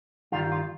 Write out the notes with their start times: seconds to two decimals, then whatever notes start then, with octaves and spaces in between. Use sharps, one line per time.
0.32 G2 D#3 G3 F4
0.52 F4